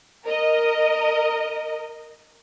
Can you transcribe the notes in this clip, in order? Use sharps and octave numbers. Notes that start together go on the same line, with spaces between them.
A#4 D#5